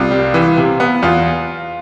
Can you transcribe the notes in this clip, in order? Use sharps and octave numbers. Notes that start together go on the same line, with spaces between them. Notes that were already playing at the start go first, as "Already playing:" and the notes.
Already playing: C2 F4
G3
E3
C3
B3
E2 F4